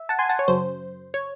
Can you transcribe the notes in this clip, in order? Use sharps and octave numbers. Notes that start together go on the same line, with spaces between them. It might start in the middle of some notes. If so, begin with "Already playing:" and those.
Already playing: E5
F#5 A5
G#5 C6
F#5 A5
C#5
F#2 C#3 F#3 C5
C#5